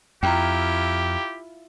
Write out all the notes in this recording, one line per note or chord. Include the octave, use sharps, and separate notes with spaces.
F2 E4 F4 G4 G5 A#5